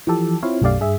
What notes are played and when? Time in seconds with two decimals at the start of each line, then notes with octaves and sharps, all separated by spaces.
0.07 E3 F3 G4 A4
0.43 C4 E4 F4 C#5 F5
0.61 B1 F#2 A3 G4 D5 F5
0.80 G2 G#4 E5